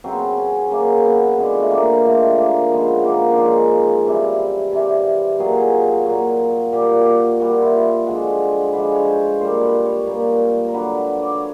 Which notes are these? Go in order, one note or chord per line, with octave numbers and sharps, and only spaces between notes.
C#3 F#3 C4
B3
C4
C#4
C#3 F#3 A#3
B3
D3 F3 G#3 B3
A3
A#3
D3 F3 G#3 A3
A#3
C#3 F3 G#3 B3
A#3
D4
C#3 F3 G#3 D#4
C3 E3 G3 E4
C3 E3 G3
A#2 F#3 G#4
A4
G#4
A#2 F#3
A#2 G3 G4
F#4 G4
A#2 G3 F#4
F4
E4
F4
D3 F3 G#3 F#4
D3 F3 G#3 B4
C#5
C5
A#2 G3 C5
B4
C#5
A#2 G3 A#4
A#4
D3 F#3 B4
D5
C#5